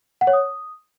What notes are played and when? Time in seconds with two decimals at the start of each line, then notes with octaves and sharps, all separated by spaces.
0.21 F#5
0.27 C#5
0.33 D#6